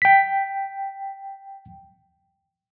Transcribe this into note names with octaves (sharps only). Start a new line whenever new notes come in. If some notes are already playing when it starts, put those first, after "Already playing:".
G5 B6